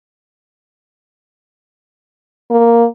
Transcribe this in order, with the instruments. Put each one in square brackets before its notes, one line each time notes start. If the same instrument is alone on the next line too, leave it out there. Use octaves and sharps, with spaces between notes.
[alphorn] A#3